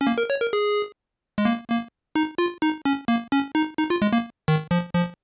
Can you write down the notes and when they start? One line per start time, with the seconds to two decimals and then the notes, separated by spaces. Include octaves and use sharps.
0.01 C#4
0.07 A#3
0.18 A#4
0.30 C#5
0.41 A#4
0.53 G#4
1.38 G#3
1.45 A#3
1.70 A#3
2.16 D#4
2.38 F4
2.62 D#4
2.85 C#4
3.08 A#3
3.32 C#4
3.55 D#4
3.78 D#4
3.90 F4
4.02 G#3
4.13 A#3
4.48 D#3
4.71 F3
4.95 F3